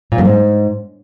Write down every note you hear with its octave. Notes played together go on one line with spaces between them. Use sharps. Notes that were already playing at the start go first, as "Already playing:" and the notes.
A#2
F#2
G#2